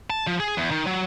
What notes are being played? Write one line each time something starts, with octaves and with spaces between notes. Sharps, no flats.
A5
F3
G#4
E2
D#3
F#3